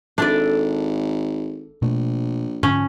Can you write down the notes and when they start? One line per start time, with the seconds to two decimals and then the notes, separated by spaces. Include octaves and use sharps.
0.18 G#1 D4 A4 B4 D5 E5
1.82 A#1 B2 A3
2.63 G#2 D3 F3 C#4